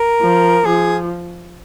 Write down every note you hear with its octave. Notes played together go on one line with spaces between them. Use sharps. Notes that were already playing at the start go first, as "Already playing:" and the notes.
Already playing: A#4
F3
F3 G#4